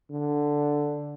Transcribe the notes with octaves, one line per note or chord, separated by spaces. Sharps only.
D3